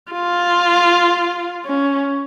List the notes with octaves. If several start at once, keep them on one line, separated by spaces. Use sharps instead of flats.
F4
C#4